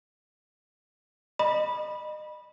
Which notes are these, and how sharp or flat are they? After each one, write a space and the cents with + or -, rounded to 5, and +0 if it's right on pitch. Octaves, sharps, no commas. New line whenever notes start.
D#5 -30 B5 -15